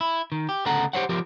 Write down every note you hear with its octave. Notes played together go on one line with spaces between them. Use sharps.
E4
D#3
G4
D2 C#3 A4 F#5 A#5
G4 C5 C#5 F#5
F3 G4 A#4